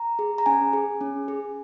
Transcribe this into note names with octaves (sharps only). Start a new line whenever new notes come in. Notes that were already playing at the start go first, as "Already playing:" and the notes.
Already playing: A#5
G#4
A#5
C#4 G#5
G#4
C#4
G#4